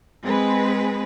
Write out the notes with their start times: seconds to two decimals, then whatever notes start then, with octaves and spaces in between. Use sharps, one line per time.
0.23 G#3 C4 G#4 B4